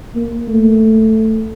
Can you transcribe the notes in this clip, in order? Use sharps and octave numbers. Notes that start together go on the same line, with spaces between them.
A#3
A3